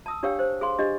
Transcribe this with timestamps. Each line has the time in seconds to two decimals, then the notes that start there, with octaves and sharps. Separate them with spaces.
0.06 A5 D#6 E6
0.23 D4 G4 C#5 F5 G5 E6
0.39 C5
0.61 G#4 F5 C6
0.79 D4 G4 D#5